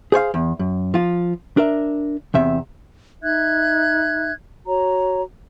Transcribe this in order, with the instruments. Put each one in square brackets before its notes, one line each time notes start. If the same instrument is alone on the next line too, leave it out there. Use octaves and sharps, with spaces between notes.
[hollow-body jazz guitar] G#4 C5 C#5 F5
E2
F#2
F3 F4
D4 A#4 E5
E2 C3 E5
[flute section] D#4 E5 F#6 G#6
F#4 C#5 A#5